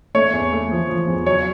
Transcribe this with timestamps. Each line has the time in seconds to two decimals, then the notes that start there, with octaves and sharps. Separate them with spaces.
0.15 A3 C#5
0.33 E2
0.52 A3
0.71 F3
0.89 F3
1.07 E2
1.26 F#3 C#5